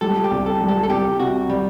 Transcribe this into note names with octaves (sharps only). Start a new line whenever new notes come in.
G3 A4
G4
C2
A4
G3
A4
A4
C2 G4
C3 F#4
G3